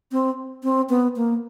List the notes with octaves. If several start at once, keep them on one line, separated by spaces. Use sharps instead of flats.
C4
C4
B3
A#3